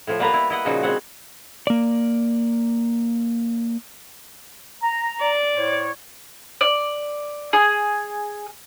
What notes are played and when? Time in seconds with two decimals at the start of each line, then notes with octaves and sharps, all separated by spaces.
0.07 A2 F3
0.19 G3 A#3 B3 B4 A#5
0.33 E4
0.50 E4 D#5 F#5
0.65 A#2 C#3 F3 D#4 F#4
0.83 G#3 B3 C4 F#5
1.67 A#3 D5
4.82 A#5
5.19 D5
5.55 A2 C5 C#5
6.61 D5
7.53 G#4